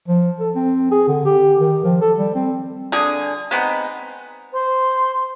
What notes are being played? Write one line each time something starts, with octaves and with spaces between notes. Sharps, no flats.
F3
A4
C4
G#4
D3
G4
D#3
F3
A4
G3
C4
D3 G#4
G#3 B3 C4 D#4
C5 C6